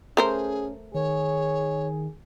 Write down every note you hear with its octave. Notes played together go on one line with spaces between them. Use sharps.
A3 C#4 G#4 A#4 C5
D#3 G#4 C#5